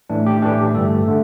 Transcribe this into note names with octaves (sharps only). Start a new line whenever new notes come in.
A2 E3 A3 D4
G4
A2 E3 A3 D4 G4
G2 D3 A3 A4
D3 A3